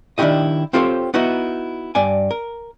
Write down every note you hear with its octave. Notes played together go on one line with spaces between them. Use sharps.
D#3 D4 E4 F#4 G4 D#5
C4 F4 G4 A4 C5 C#5
B3 D#4 E4 F#4
G2 D5 G#5
A#4